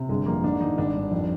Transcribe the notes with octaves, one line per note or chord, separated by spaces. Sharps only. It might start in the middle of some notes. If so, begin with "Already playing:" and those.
Already playing: C3
G1 G#3
F2 A#3
G#2 D4
D#3 D#4
G#1 D4
G2
F2